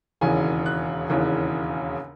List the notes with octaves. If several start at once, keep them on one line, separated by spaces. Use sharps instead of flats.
E1 D#2 C#3 E3 G#5
F#6
E1 D#2 C#3 E3